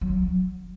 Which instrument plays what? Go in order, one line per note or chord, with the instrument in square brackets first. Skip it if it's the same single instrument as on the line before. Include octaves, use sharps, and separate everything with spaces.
[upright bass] F#3